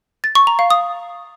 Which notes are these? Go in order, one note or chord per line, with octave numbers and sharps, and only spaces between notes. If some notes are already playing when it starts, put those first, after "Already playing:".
A6
C#6
A#5
F5
D#6